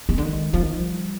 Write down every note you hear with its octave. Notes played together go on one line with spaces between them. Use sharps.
G#3
D3
D#3
F3 G3
D#3
F3